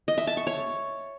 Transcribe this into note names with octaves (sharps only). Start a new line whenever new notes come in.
D#5
E5
A5
C#6
C#5